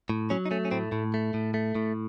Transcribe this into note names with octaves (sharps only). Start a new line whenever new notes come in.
A2
F#3 C#4
D#4
A3 C#4
C#4
A2 C4
A2
A3
A2
A3
A2